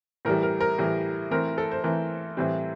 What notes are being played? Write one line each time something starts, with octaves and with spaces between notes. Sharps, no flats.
A2 E3 G3 A#4
A#4
A#4
A2 E3 G3
E3 A3 C4 A#4
A4
C5
E3 A3 C4 A#4
A2 E3 G3 C4